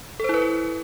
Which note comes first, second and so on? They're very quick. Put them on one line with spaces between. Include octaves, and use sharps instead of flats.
A4 C5 E4 B4